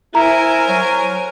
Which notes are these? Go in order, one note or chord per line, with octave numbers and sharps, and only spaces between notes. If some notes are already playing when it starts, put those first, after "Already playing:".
E4 A#4 C5 G#5 A#5
F#3